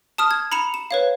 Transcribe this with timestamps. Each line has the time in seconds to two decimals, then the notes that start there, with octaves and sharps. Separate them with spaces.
0.18 A5 D#6 F6
0.31 G#6
0.52 A#5 B5 C#7 E7 F7
0.74 E7
0.91 B4 C#5 F5